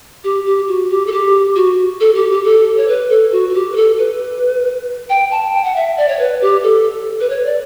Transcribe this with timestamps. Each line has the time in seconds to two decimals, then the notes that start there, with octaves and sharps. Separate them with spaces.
0.24 G4
0.46 G4
0.68 F#4
0.89 G4
1.07 A4
1.12 G4
1.56 F#4
2.00 A4
2.15 G4
2.30 G4
2.44 A4
2.77 C#5
2.88 B4
3.10 A4
3.32 F#4
3.49 F#4
3.54 G4
3.72 B4
3.76 A4
3.98 B4
5.10 G5
5.31 A5
5.54 G5
5.64 F#5
5.76 E5
5.97 D5
6.09 C#5
6.19 B4
6.42 G4
6.63 A4
7.20 B4
7.30 C#5
7.45 D5